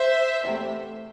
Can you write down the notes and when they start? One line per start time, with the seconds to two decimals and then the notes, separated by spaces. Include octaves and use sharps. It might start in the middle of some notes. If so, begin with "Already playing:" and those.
Already playing: C5 E5
0.44 E2 C3 A3